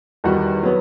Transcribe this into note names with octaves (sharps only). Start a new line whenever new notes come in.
E2 D#3 G3 D#4 F#4
F#3 B3